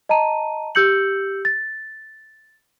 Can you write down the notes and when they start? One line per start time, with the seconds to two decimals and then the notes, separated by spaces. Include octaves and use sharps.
0.09 D#5 A5 A#5 D#7
0.75 G4 E6 G6 C#7 F#7
1.45 A6